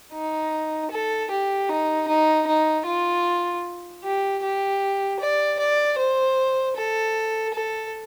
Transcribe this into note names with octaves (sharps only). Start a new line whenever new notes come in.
D#4
A4
G4
D#4
D#4
D#4
F4
G4
G4
D5
D5
C5
A4
A4